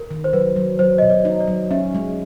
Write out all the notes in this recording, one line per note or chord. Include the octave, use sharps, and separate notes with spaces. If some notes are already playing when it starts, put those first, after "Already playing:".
Already playing: A#4
D#3
C5
F#3 B4
F#3
F#3 C5
B2 D#5
D5
D#4
D5
F#3
C#4 E5
G#3